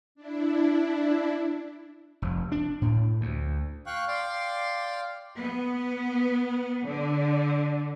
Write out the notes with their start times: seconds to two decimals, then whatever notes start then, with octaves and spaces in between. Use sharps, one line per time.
0.15 D4 E4
2.22 F1
2.52 D4
2.81 A2
3.21 D2
3.86 F5 G5 C#6 F#6
4.08 D5 F5 G5 C6 D6
5.38 B3
6.85 D3